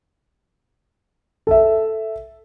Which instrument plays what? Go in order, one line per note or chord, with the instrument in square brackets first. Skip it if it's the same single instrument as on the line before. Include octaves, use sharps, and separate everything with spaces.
[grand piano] A4 E5